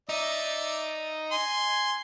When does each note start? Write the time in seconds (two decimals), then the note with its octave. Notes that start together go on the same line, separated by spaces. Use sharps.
0.09 D#4 D5 E5
1.32 G#5 C6